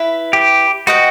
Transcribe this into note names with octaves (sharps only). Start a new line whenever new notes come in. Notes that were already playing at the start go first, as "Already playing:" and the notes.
Already playing: E4 B4 E5 B5
G4
F#4 B4 D#5 G5